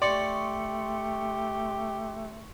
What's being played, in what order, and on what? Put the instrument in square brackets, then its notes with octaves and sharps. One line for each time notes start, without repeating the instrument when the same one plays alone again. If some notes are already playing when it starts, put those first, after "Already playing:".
[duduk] A3 [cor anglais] G4 [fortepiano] D5 [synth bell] C6 C#6 C#7